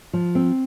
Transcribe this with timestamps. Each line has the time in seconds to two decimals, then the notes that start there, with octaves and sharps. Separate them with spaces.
0.13 F3
0.35 C4